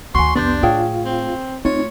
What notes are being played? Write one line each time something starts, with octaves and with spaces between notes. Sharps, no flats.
D2 D#3 F#4 G#5 C6 C#6
C2 F2 B3 D4 G4 D5 C6 G6
A2 F4 G#4 C#5 F5 G5
C4
A3 C4 D#4 F4 C#5